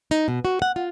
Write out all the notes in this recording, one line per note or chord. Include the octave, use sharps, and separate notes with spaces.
D#4
B2
F#4
F#5
F4